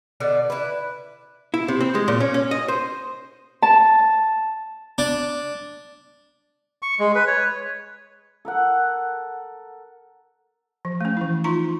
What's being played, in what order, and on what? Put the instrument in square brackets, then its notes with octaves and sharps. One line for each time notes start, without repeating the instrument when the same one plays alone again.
[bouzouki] B2 D3 D5
E4 B4
[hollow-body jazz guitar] E4
C3
C4
G#3
A#2
C#4
C#4
D#5
C5
[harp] A5
[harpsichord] D4
[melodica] C#6
G#3
B4
C#5
[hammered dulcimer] A4 A#4 F#5
[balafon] F3
A3 C#4
E3 E4
D#4 F4 A#5 C6 C#6